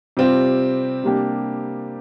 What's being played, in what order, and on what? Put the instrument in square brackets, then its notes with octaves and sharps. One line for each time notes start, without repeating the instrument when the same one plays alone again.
[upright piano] C3 G3 C4 F4
C3 G3 A#3 D4 G4